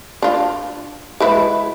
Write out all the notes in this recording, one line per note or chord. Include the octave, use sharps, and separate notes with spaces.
D4 F4
G#3 E4 B4